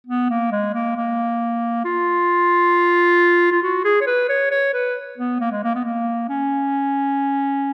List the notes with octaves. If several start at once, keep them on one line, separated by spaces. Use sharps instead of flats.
B3
A#3
G#3
A#3
A#3
F4
F4
F#4
G#4
C#5
B4
C#5
C#5
B4
B3
A#3
G#3
A#3
B3
A#3
C#4